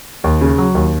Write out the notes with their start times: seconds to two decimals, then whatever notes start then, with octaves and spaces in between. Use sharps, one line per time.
0.24 D#2
0.41 C#3
0.58 F#3
0.75 D#2